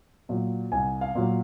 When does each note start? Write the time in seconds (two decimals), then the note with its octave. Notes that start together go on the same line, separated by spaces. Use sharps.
0.29 A#2 F#3
0.72 C2 G#5
1.01 F5
1.15 A#2 F#3